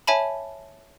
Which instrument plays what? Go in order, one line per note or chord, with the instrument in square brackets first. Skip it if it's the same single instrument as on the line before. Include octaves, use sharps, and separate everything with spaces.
[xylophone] C#5 E5 G#5 A5 B5